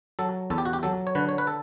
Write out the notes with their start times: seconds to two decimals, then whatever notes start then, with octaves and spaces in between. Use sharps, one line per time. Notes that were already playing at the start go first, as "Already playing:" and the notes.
0.19 F#3 A4
0.50 E2 A4
0.58 G4
0.65 F#4
0.73 G4
0.83 F#3 A4
1.07 C#5
1.15 D3 B4
1.29 C#5
1.38 B4
1.47 A4